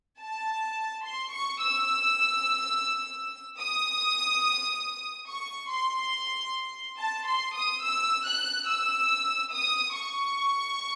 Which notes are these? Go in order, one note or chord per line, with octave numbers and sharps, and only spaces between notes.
A5
C6
C#6
E6
D#6
C#6
C6
A5
C6
D#6
E6
F#6
E6
D#6
C#6